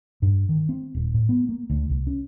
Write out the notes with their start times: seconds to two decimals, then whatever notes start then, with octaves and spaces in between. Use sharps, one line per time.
0.22 G2
0.49 D#3
0.69 C4
0.94 D#1
1.14 A2
1.29 B3
1.49 A#3
1.70 D2
1.90 C2
2.07 C#4